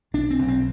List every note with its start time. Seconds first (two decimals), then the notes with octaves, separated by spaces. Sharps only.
0.14 B1 D4
0.30 C4
0.39 B1
0.48 C4